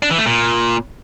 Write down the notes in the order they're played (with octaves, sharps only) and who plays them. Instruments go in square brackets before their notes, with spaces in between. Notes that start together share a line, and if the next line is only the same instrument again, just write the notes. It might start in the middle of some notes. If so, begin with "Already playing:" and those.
[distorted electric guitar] D4
E3
A3
A#2